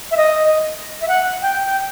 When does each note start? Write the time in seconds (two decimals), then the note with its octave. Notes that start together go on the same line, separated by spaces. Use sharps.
0.11 E5
0.17 D#5
1.01 E5
1.08 F#5
1.42 G5
1.65 G5